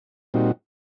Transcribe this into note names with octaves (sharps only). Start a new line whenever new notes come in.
A#2 G3 C4 D#4 F#4